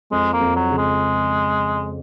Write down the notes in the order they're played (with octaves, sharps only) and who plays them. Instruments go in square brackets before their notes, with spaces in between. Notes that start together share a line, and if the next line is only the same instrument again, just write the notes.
[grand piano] F2 [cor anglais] G#3
[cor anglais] A#3
[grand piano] F2
[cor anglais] F#3
[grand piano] C#3
[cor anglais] G#3